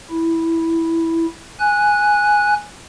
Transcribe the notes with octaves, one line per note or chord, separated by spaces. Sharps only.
E4
G#5 F#6